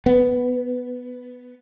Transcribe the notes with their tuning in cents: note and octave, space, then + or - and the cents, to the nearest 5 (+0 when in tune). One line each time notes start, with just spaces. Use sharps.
B3 +5